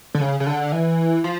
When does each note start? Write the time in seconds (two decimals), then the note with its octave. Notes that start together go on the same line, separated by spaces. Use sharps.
0.15 D3
0.21 C#3
0.40 C#3
0.47 D3
0.72 E3
1.24 F3